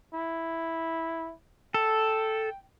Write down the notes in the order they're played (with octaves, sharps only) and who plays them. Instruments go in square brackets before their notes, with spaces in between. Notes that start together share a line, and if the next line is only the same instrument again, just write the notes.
[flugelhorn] E4
[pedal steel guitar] A4 [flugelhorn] G5